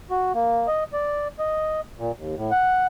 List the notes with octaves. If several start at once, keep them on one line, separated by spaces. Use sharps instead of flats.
F#4
A#3
D#5
D5
D#5
A#2
D#2
A2
F#5